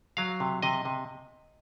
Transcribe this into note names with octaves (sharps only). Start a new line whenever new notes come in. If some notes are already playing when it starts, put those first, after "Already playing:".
F#3 F5
C3
C3 D#5
C3